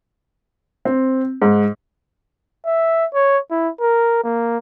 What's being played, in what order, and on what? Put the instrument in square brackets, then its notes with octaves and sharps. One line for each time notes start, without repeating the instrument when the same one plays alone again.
[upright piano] C4
G#2
[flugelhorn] E5
C#5
E4
A#4
A#3